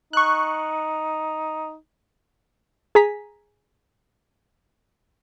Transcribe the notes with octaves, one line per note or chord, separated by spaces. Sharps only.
D#4 C#6 F#6
G#4 G#5 A#5 B6